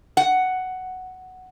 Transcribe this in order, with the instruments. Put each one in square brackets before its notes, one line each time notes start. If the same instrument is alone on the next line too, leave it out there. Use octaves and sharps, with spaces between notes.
[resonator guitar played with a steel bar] F#5